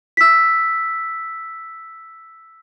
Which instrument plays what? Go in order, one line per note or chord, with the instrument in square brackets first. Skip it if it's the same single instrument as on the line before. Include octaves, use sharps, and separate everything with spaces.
[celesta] E6 B6